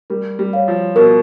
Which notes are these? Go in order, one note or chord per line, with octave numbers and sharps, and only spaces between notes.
G3 A#4
G3
C#5 F5
F3
B2 A#4